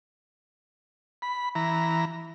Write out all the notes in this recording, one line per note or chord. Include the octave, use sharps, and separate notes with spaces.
B5
E3 A#5